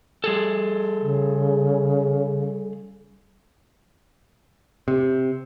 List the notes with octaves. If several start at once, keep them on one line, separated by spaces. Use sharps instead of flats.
G3 G#4 A4
C#3
C3